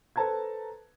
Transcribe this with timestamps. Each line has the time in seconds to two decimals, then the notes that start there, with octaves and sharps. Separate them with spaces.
0.16 A4 B4 C5 A5 A#5 G#6